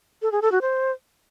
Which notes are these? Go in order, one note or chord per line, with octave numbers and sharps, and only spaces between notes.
A4
G#4
A4
F#4
C5